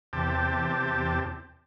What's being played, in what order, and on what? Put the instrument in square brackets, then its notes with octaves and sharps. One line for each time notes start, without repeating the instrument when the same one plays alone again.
[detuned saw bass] E2 [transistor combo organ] C3 G4 A5